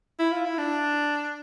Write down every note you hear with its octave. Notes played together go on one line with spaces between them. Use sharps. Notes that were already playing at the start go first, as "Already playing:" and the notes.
E4
F4
E4
D4